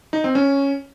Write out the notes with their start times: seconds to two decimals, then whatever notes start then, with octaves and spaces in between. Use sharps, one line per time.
0.13 D#4
0.24 C4
0.35 C#4